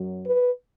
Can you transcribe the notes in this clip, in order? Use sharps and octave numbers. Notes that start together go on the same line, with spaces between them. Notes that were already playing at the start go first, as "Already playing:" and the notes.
Already playing: F#2 F#3
B4